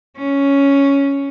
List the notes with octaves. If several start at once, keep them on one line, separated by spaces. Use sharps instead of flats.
C#4